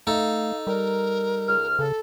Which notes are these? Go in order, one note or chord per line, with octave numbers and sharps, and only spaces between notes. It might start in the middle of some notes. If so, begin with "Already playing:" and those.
A3 D#4 A4 F5
G3 A#4
C#2 F6
C#3 A4